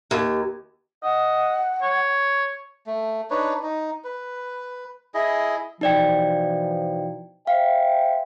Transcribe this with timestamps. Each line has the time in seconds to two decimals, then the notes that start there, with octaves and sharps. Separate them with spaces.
0.11 D#2
1.03 D#5 F#5
1.82 C#5
2.87 A3
3.30 D4 D#4 B4 C#5
3.63 D#4
4.04 B4
5.14 E4 G#4 D#5
5.81 B2 E3 F3 D#4 D5 G5
7.47 C5 E5 F5 G5